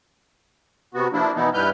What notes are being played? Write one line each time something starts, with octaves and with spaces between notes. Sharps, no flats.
C3 B3 F#4
F3 A#3 D4 E4
B2 E3 B3 D#4 E4
G2 G3 E4 B4 F6 G6